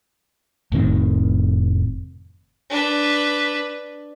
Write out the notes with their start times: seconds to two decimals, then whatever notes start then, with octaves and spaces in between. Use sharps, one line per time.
0.72 F1 A2 D#3 C4
2.70 D4 B4